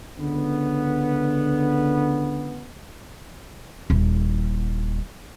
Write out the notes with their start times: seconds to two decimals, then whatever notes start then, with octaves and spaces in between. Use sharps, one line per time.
0.19 C#2 D3 B3
3.90 D#1 E4